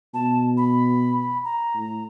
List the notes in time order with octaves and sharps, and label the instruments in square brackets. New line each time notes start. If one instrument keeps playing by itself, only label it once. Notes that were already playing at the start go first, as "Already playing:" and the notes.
[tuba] B2 [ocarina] A5
[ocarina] B5
A#5
[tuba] A2